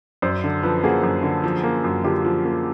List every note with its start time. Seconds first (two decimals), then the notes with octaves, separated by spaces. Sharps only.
0.22 F#2 C5 D5
0.44 D3
0.63 F3 A4 B4
0.83 A#3 F#4 G#4
1.03 F#2
1.23 D3
1.44 F3
1.63 A#3
1.84 F#2
2.04 D3 F4 G4
2.25 F3
2.45 A#3